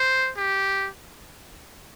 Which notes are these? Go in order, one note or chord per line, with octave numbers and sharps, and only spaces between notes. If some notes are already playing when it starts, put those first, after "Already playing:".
Already playing: C5
G4